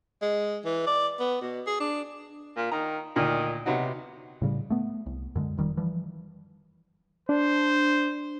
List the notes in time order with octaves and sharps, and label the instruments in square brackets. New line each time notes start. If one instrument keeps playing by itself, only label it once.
[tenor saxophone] G#3
E3
D5
B3
B2
G#4
D4
[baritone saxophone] A#2
[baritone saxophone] D#3 [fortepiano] A#5
[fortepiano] D2 A#2 [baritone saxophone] D#3
[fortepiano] C3 B3 D#4 [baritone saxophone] F#3
[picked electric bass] A2 C#3 G3
A3 B3
C2
F#2 D3 G#3
F1 D#3 G3
E3 F3 G3
[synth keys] D4 [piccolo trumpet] C5